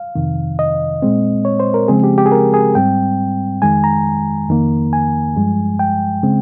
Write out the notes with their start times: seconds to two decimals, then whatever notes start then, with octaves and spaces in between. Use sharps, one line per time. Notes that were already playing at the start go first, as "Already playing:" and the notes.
Already playing: F5
0.15 F2 C3 D#3
0.59 D#5
1.02 A#2 G#3 C4
1.45 C#5
1.60 C5
1.74 A#4
1.88 C#3 F3 G#3 C4 G#4
2.04 G4
2.18 G4
2.26 G#4
2.32 A#4
2.54 G#4
2.75 G#2 G3 C4 G5
3.62 F2 D#3 G#3 G#5
3.84 A#5
4.49 F2 D#3 A#3
4.93 G#5
5.36 G2 F3 G#3
5.79 G5
6.23 C#3 G#3 C4